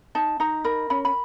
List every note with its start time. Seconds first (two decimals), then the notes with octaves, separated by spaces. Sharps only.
0.15 D#4 A5
0.40 D#4 A#5
0.64 A#4 B5
0.90 C#4 B5
1.05 B5